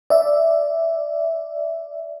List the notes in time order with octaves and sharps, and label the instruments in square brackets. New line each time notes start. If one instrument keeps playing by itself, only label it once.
[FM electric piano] D5 E5